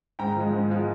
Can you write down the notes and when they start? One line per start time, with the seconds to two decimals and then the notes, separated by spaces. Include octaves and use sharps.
0.19 G#2 G5 A#5
0.37 F3 G#3
0.53 G#2
0.70 F3 G#3